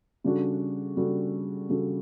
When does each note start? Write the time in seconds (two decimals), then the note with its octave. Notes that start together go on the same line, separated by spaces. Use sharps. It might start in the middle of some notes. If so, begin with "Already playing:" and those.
0.24 C#3 G3 D4 F#4 A4
0.97 C#3 G3 D4 F#4 A4
1.70 C#3 G3 D4 F#4 A4